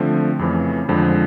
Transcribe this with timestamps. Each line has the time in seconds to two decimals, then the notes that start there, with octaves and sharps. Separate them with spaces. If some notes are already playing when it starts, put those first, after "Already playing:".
Already playing: D3 F3 A3 C4
0.39 F2 C#3 E3 A3
0.88 F2 D3 F3 G#3 C4